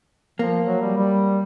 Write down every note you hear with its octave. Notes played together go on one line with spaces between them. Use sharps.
F3 A#3
F#3
G3
G3